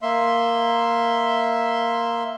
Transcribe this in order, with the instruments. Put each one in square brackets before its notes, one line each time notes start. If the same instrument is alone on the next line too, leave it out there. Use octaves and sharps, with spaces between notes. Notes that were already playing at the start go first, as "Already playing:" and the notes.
[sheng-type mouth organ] A#3 E5 C6